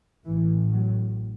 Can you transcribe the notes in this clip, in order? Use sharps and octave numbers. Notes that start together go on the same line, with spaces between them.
A1 A2 E3
F#3